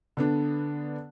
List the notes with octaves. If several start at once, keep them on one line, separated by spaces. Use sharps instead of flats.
D3 B3 D4